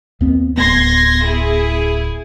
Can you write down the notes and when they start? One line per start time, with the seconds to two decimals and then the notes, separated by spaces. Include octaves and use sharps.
0.21 D#2 B3 C4
0.57 D1 B3 C6 G#6 A#6
1.24 E4 G#4